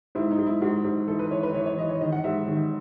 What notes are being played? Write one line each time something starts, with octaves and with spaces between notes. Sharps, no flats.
G#2 E4
D#4
G#2
E4
G#2 F#4
G#2
E3 A4
B4
E3 C#5
B4
E3 C#5
C#5
E3 D#5
C#5
D#3 D#5
F#5
G#2 E5
D#3